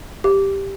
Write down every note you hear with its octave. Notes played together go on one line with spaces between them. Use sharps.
G4